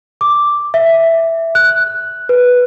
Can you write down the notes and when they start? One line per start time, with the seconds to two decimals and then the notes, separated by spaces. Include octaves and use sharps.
0.21 D6
0.74 E5
1.55 F#6
2.29 B4